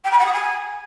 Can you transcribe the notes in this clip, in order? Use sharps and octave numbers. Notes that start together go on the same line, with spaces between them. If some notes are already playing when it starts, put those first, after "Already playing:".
G5
B5
F#5
D#6
G#5